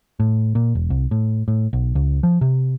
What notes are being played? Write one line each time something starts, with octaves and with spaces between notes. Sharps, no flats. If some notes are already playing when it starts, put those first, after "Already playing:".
A2
A#2
E1
C2
A2
A2
B1
C#2
F3
C3